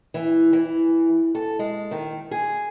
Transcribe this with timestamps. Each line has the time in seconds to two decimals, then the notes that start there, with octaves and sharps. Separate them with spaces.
0.14 E3
0.53 E3
1.35 A4
1.59 G#3
1.91 D#3
2.31 G#4